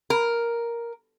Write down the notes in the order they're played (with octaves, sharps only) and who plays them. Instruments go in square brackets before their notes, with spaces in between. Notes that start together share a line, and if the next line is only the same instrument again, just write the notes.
[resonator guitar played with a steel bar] A#4